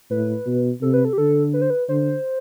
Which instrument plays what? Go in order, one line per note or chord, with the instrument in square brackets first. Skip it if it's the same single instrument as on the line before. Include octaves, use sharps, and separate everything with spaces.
[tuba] A2 [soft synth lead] B4
[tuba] B2
[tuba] C3 [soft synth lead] A4
[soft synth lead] B4
A4
G4
[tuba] D3 [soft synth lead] A4
[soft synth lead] B4
C5
B4
[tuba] D3 [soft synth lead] C5